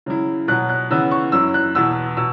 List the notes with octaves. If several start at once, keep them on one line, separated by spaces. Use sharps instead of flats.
C#3 F#3 E4
B2 F#3 B3 F#6
F#6
C#3 E3 B3 E4 E6
C#6
F#2 F#3 E4 E6
F#6
E2 B2 B3 E6
B2 E6